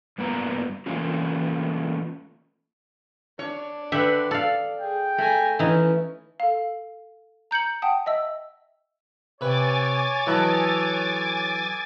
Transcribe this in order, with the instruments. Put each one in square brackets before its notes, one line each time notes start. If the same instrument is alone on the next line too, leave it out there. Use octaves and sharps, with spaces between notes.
[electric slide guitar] G2 A#3 B3 B4 A#5
E3 A3 A#3 C#4 F4
[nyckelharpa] D4 [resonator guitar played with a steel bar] C#5
[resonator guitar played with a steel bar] D3 B4 [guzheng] G4 E5
[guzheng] A4 F5 [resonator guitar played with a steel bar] D5
[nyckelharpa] G#4 [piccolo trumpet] G5
[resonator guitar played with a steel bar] A3 [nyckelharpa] G#5 A#5
[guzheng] E3 D#4 [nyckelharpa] C#4 E4
[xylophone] A4 F5
A#5 G6 C#7 F#7
F#5 G5 A5 D#6
D#5 E5 E6
[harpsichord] C3 B4 [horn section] C#5 [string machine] G#5 D6 A6
[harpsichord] E3 F#3 E4 [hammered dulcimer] A4 B4 D#5